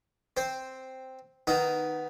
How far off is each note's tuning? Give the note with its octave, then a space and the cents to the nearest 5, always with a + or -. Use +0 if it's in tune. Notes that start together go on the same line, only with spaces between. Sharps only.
C4 +0 C5 +0
D#3 -10 B3 +0 D#4 +0